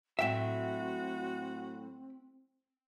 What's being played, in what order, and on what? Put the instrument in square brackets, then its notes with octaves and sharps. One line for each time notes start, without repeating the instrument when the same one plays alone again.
[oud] A2 F#3 [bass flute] C4 [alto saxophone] F#4 [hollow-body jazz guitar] E5 G5